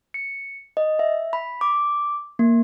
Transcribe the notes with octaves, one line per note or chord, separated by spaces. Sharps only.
C#7
D#5
E5
B5
D6
A#3